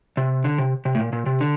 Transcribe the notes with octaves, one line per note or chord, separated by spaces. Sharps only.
C3
D3
C3
C3
A2
A#2
A#2
C3
D3